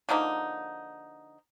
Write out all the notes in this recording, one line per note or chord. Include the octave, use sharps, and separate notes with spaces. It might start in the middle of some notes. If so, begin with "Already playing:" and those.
D3 F3 A#3 D#4